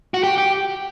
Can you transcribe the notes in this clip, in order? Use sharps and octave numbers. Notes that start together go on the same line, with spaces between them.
F#4
G4
G4